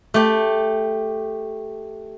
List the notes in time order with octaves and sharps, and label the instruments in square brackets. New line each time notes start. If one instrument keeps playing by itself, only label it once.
[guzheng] A3 G4